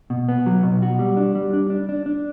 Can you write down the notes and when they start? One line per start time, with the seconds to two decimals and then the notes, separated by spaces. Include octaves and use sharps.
0.10 B2
0.29 B3
0.46 F#3
0.63 B2
0.82 F#4
0.99 G3
1.17 D4
1.35 G3
1.53 D4
1.70 D4
1.89 D4
2.06 D4